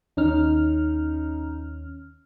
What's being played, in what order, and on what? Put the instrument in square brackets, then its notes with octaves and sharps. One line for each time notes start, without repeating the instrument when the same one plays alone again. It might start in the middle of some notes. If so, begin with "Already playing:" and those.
[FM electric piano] D#2 C#4 F6 [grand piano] D#4